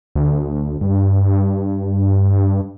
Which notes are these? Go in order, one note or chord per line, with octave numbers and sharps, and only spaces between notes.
D2
G2